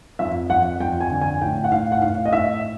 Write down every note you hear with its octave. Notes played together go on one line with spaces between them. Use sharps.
F2 E5
F2 F#5
F2 G5
G#5
D3
G#5
A2 G5
F#5
A2 F5
F#5
A2 F5
D#5
A2 E5